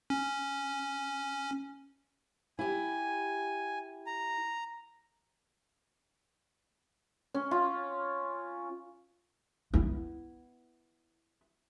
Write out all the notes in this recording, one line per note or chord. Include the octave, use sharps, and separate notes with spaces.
C#4
E4 G4 G#5
A#5
C#4
F4
B3 E4